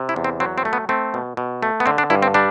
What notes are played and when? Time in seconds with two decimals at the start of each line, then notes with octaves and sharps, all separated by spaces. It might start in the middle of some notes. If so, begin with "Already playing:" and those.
Already playing: C3
0.09 E4
0.16 E2
0.24 C4
0.40 F#3 C4
0.58 C4
0.65 A3
0.73 B3
0.89 A3 C4
1.14 B2
1.37 B2
1.63 A3
1.80 B3
1.86 D3 C4
1.98 D4
2.10 G2 E4
2.22 C4
2.34 G3 D4